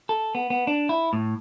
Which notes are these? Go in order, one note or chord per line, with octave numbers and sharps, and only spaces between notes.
A4
B3
B3
D4
E4
A2